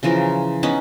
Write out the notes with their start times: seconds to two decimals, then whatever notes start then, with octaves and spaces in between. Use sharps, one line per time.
0.03 C#3 E3 F3 A#4
0.63 B3 C#4 D#4 B4